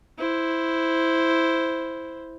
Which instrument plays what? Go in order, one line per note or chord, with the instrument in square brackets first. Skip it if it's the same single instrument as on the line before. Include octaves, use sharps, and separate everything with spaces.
[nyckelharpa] E4 C5